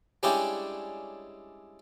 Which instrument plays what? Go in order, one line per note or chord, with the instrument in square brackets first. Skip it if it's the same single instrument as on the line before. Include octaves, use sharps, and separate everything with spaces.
[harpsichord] G3 G#3 C#4 D4 E4 G4